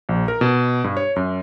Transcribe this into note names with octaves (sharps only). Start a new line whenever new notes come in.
A#1
A#4
B2
G2
C#5
F#2